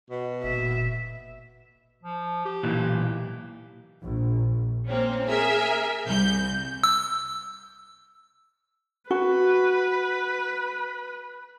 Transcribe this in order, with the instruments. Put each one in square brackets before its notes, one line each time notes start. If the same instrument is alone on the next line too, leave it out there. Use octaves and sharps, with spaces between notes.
[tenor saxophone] B2
[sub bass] F#1 [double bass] A#2 [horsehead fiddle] E5
[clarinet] F3
G4
[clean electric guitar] B1 A#2 E3
[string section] A#1
A#3 C4 C#4
G#4 A#4 E5 G#5
C2 G6
[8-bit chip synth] E6
[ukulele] F#4 [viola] B4